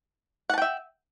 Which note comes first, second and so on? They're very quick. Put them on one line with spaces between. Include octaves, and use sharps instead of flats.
F#5 A5 G5 E5